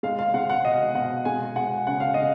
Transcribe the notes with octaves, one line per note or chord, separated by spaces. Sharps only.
G#3 F5
F5
G#3 F#5
F#5
B2 D#5
B2 F#5
G#3 G#5
G#3 F#5
C#3 F#5
F5
C#3 D#5